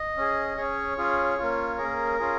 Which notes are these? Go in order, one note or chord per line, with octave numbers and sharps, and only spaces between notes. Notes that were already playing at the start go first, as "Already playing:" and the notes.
Already playing: D#5
C#4 G#4
C#4 G#4 C#5
C#4 F4 G#4
A#3 C#4 F4
A#3 C#4 G#4 A#4
C#4 F4 G#4